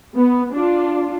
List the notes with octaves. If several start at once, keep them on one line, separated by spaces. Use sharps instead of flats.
B3
D4 F4